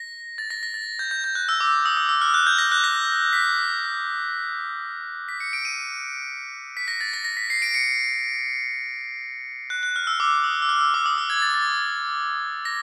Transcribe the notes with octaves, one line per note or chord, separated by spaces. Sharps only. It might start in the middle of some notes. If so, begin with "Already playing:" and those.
Already playing: A#6
A6
A#6
A#6
A6
G6
G6
G6
F#6
E6
D6
D#6
D#6
E6
F6
F#6
G6
A#6
F#6
A#6
B6
B6
C#7
D7
D#7
B6
A#6
A6
A#6
A#6
B6
C7
D7
C#7
F#6
F#6
F6
E6
D6
D#6
E6
F6
E6
D6
D#6
E6
G#6
A6
A6
A#6